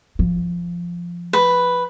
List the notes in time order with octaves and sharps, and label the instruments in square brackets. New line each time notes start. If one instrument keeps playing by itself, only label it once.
[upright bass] F3
[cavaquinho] B4